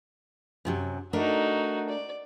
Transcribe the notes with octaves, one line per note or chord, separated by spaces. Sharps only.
F#2 C3 F#3
A3 D4 D#4 F#4 A#4
D5